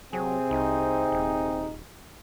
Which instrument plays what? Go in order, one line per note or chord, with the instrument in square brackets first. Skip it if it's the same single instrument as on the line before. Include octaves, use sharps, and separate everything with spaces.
[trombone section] C3 C4 [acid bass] F#3 [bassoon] G#4
[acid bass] C2 [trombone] D#4
[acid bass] D#1